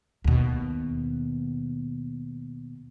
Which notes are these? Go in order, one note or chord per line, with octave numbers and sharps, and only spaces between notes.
D#2 B2